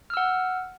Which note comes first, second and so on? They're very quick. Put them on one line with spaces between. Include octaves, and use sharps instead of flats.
F6 E6 F#5